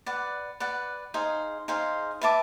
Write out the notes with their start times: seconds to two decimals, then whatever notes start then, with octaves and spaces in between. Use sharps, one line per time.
0.06 B4 D5 F#5
0.60 B4 D5 F#5
1.14 D#4 G#4 C5 F5
1.68 D#4 G#4 C5 F5
2.21 B4 E5 A5 D6